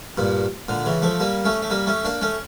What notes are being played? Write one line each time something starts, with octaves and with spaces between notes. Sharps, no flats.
G2 A#2
A#2 D3
C#3 E3
F3 A3
G3 A#3
A3 C#4
A3
G3 A#3
A3 C#4
A#3 D4
A3 C#4